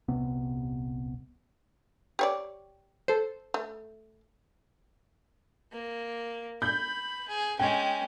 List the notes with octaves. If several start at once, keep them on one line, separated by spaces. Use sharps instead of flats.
D#1 C2 C3 B3
G4 C#5 D5
A4 C5
A3
A#3
B5 G6
G#4
G#3 C#4 G5